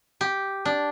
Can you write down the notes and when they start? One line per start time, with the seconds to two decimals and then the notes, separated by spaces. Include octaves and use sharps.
0.21 G4
0.65 D4